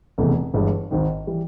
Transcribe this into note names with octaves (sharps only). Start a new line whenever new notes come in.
F1 E2 C#3 E3 A3
G1 G2 E3 G#3
G#1 G#2 D#3
E3 G3